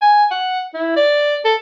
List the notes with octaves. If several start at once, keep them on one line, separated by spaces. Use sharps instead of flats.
G#5
F#5
E4
D5
A4